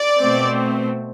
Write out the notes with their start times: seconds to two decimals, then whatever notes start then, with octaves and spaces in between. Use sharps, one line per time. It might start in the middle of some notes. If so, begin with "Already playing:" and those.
Already playing: D5
0.19 B2 A3 C4